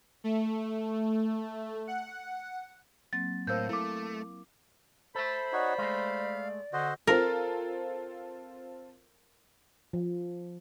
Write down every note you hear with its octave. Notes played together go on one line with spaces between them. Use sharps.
A3
F#5
F#3 A#3 C4 A6
A2 A#4 C5 F5 E6 G6
A3 E4 D6
A4 C5 E5 B5
D#4 F#4 C#5 D5
G#3 A3 F5
D3 F#4 C5 D#5
C4 F4 A4 A#4
F3